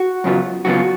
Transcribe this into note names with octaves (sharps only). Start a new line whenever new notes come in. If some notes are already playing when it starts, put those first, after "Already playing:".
Already playing: F#4
F#2 C#3 F#3 B3 F4
F#2 C#3 F#3 B3 F4 F#4